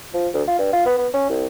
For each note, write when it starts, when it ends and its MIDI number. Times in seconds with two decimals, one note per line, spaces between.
0.14 0.28 53
0.34 0.43 38
0.48 0.56 65
0.59 0.69 43
0.73 0.86 65
0.86 0.95 59
0.98 1.08 59
1.14 1.27 61
1.30 1.46 36